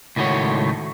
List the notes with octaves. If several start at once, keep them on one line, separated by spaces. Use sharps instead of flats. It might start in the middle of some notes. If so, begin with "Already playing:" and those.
C#2 A2 D#3 A3 F#4 C#5